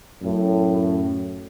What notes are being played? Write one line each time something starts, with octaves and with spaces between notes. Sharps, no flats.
F#2 A2